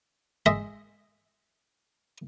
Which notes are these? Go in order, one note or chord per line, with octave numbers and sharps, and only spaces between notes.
G#3 D#5 E5